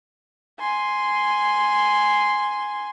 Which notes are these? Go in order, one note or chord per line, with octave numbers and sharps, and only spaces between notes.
G#5 C6